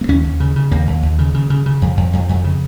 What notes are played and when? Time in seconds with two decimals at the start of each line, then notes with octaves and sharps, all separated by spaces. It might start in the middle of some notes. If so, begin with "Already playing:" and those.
0.01 A#3
0.08 D#2 C#4
0.24 D#2
0.40 C#3
0.56 C#3
0.71 D#2 A#3
0.87 D#2
1.03 D#2
1.19 C#3
1.34 C#3
1.50 C#3
1.66 C#3
1.82 F2
1.97 F2
2.13 F2
2.29 F2
2.44 C#3